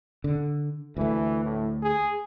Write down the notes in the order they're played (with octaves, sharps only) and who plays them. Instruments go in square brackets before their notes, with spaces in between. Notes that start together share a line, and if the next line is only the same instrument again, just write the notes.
[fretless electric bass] D3
[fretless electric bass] D2 A3 [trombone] E3
[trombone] A2
G#4